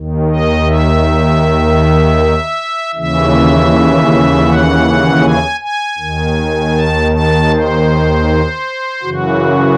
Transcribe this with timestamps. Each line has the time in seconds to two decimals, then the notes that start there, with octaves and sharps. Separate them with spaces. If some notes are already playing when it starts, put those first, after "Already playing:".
Already playing: D#2 D#3
0.28 D#5
0.67 E5
2.94 D#2 C#3 E3 E5
4.46 F#5
5.22 G#5
5.60 G#5
5.98 D#2 D#3
6.75 A5
7.12 A5
7.50 C5
9.02 F#2 C#3 E3 F#4